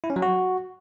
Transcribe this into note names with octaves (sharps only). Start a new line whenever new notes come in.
E4
C#4
F#3
F#4